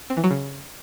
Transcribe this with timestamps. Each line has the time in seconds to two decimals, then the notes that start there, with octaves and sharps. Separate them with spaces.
0.10 C4
0.17 E3
0.24 F#3
0.31 C#3